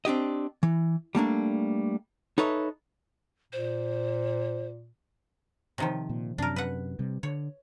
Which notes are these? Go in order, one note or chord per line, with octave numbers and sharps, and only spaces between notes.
C4 D4 G4 D#5
E3
G3 A3 A#3 D4
D#4 A4 B4 C#5 E5
A#2 C5
C3 D#3 F3
A#2
F#2 C3 D4 A#4
B4 F#5
C3 G3
D3 C#5